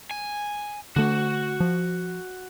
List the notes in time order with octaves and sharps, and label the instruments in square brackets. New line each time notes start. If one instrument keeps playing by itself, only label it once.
[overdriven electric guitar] G#5
[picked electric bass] D3 A3 [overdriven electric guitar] F#4
[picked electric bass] F3